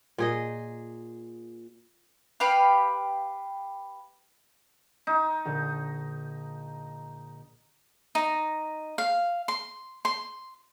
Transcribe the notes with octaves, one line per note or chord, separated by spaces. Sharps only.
A#2 G#4 D#5
G4 B4 F5
D#4 E6 C7 E7
A#1 D3
D#4
F5
C6
C6